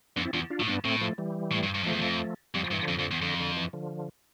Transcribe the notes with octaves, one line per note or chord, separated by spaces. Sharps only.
F2 B3 D4
C4 E4
E2 D4 F4
D4 F4
A2
G2 B3 D4
A2 A3 C4
F3 A3
E3 G3
A2
G2
G2
F2 F3 A3
E2
F2
F2 G3
F3
G2
E3
D3 F3
F2
F2
E2
F2 D3
D3
E3
D3 F3